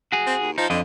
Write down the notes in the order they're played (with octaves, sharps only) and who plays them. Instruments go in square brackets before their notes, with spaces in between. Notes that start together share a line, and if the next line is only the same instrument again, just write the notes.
[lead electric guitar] F#4 G#4
[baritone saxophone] C4
D#2
[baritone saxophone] F3 [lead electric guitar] D#4
[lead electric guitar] F2 D#5 [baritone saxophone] D3